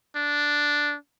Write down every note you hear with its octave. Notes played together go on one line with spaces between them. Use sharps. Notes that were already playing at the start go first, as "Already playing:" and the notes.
D4